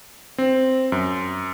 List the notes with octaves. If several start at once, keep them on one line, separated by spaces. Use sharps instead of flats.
C4
F#2